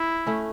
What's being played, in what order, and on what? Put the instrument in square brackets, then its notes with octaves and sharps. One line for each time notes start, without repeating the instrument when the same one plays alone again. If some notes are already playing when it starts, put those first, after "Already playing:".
Already playing: [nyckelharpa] E4
[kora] A3 C#4